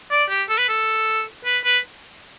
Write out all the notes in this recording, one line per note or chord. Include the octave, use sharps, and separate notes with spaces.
D5
G4
A4
B4
A4
B4
B4